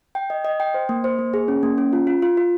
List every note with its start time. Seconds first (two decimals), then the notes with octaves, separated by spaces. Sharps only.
0.15 G5
0.30 D#5
0.45 D#5
0.60 G5
0.74 C5
0.89 A#3
1.04 C5
1.19 A#3
1.34 G#4
1.48 C#4
1.63 A#3
1.78 C#4
1.93 F4
2.07 F4
2.22 F4
2.37 F4